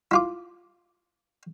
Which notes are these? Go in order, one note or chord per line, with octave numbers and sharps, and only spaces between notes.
E4 F4 D6